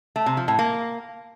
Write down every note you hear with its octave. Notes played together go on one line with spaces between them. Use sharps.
A3
C3
F3
A2
A#3